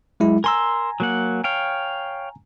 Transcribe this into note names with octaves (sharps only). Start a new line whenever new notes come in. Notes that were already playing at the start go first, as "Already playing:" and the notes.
F#3 G#3 E4
A#4 G#5 A#5 C6 E6
F#3 A#3 F#5
C#5 F5 G5